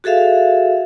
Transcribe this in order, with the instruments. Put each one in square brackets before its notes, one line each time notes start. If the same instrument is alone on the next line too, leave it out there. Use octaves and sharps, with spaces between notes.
[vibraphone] F#4 G#4 A4 E5 F5